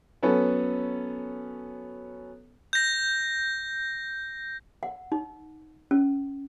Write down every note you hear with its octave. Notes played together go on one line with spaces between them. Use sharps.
F#3 B3 C#4 A4 B4
G6 A#6
F#5
D#4
C#4